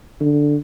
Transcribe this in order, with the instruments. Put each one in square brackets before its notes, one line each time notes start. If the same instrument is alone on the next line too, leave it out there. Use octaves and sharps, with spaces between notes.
[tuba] D3